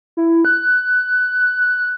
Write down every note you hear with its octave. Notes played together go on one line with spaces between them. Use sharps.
E4
F#6